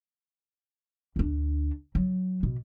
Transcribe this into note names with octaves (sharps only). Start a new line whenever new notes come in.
D2 D4
F#3
B2